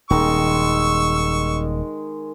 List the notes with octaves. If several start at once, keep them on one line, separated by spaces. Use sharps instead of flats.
D#1 D#3 G#3 C#6 E6